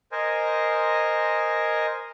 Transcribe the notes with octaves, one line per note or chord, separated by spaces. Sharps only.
A#4 C5 D#5 G#5